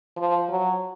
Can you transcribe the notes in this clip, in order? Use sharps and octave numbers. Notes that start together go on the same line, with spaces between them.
F3
F#3